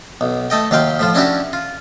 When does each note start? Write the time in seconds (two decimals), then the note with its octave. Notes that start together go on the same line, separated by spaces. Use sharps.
0.21 B1
0.50 A3 A4 D#5 G5
0.71 D#2 F#3 G4 F5 G5 C6
0.99 A2 F3 F4
1.15 C#4 D4 E4 F#4 G4
1.53 F4